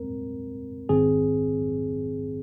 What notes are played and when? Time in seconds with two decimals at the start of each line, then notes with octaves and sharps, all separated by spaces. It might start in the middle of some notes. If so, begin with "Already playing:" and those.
Already playing: G#2 G#3 C4 A#4
0.89 A#1 G#2 D#3 C4 G#4